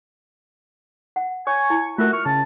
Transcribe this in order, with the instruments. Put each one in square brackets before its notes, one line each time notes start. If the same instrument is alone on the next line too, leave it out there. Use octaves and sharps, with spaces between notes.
[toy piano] F#5
[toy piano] C#5 [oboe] G#5 [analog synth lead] C#6
[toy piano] E4
[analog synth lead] A3 [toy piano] F4 A#4 E5 [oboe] F#4
[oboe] C#6 [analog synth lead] F6
[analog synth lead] C#3 [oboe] A5